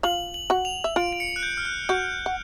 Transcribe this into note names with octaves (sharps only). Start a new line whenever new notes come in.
F4 F5 F#7
F#7
F#4 F#5
F7
E5
F4 F5 D7
D7
C#7
F#6
G6
F6
F#6
F#4 F#5 G6
F#5